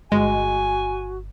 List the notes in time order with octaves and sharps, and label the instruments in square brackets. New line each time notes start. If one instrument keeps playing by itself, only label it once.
[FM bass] G1 [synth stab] G#3 [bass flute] F#4 [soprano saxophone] G#5